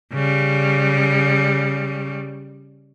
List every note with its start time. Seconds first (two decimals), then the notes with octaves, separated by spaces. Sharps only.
0.13 C#3 G3